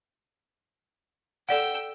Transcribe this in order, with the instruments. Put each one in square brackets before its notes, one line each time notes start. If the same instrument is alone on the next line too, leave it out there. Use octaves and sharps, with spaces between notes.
[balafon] A4 D5 F#5 [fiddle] G5 E6